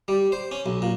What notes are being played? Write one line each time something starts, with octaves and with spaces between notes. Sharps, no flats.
G3
C5
C#4
B1
A#2